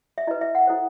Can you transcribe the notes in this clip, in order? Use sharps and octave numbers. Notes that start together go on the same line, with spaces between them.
E5
E4 B4 D#5
E5
F#5
E4 A4 C5